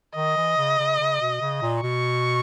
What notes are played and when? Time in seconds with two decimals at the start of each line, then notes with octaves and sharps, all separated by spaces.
0.16 D#3 D#5
0.37 E3
0.57 C#3
0.79 C#3
1.00 C#3
1.21 B2
1.41 C#3
1.62 A#2
1.82 B2 C#6